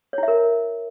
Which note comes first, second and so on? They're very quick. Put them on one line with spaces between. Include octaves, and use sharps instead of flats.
C#5 E4 E5 A#4